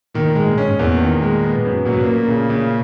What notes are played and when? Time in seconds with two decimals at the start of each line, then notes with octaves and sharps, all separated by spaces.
0.14 A#2 D#3
0.26 A#2
0.35 G#3
0.46 A#2
0.58 C#4
0.68 G#2
0.79 E2 A#2
0.89 A#2
1.00 D#3
1.22 G#3
1.43 B3
1.65 F#2
1.85 A#2 F#3
1.94 B2
2.01 A#2
2.07 A#3
2.28 C#3
2.50 C#3